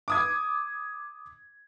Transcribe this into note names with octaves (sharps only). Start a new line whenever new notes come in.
D6 D#6 G#6